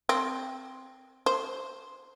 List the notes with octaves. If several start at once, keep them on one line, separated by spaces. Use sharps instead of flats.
C4
C5